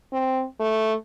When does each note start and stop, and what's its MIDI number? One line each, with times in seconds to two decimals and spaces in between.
0.13 0.45 60
0.60 0.95 57